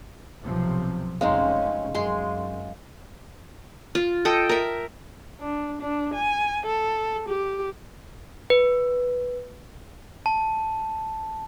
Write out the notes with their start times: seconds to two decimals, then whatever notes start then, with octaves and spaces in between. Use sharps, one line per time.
0.43 B1 C3 F3
1.21 F1 C#3 G#3 C4 C#4 D#4 F5
1.94 F#2 G#3 G#4 C6
3.95 F4
4.25 A4 D#5 G5
4.49 A#4 E5
5.41 D4
5.81 D4
6.14 G#5
6.66 A4
7.28 G4
8.50 B4
10.26 A5